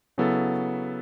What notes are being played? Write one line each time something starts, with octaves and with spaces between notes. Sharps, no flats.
C#3 F#3 B3 E4 A4